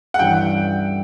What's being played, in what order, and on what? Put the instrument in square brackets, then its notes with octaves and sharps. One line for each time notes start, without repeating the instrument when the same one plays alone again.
[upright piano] F#5
[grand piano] G2 E3 G3 C#4 E4 [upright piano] G5